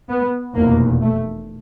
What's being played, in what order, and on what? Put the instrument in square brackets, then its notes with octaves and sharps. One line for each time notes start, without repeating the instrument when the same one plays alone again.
[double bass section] B3
F1 E2 B2 A#3
A3